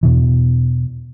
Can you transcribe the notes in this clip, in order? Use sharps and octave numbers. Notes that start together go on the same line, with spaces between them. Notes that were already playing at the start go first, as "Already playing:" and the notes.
E2 B2 E3